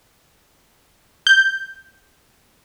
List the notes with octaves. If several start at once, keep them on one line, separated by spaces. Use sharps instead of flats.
G6